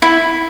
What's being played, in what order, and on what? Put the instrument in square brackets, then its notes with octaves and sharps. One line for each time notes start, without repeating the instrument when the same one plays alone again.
[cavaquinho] E4